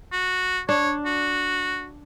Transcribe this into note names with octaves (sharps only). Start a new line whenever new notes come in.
F#4
D4 C#5
F#4